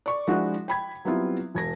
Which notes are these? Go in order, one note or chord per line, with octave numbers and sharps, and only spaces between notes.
D5 C#6
F3 G#3 D4 E4 F#4
G5 B5 G#6
F#3 G3 B3 C4 E4 F4
E1 G#6 A#6